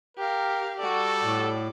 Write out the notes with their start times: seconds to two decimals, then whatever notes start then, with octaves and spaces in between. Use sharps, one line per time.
0.18 G4 A#4 F5
0.80 G3 F#4 A4 D5
1.23 A2